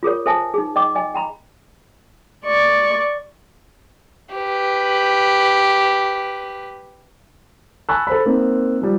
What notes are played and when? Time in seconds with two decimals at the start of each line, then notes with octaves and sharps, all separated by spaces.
0.03 F4 G#4 A#4 C#5
0.26 A4 C5 E5 G#5 A5
0.54 D#4 G#4
0.76 D#5 G5 D6
0.95 D#5 G#5
1.14 G5 A#5 B5
2.46 D5 C#6
4.35 G4 B4
7.89 G#5 A5 B5 C#6 E6 F#6
8.07 A4 C5 B5
8.26 A#3 C4 D#4
8.82 F3 G3